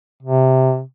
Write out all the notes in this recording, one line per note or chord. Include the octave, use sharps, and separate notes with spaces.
C3